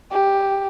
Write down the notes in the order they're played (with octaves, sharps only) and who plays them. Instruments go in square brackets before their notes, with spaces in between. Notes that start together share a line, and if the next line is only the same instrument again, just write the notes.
[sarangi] G4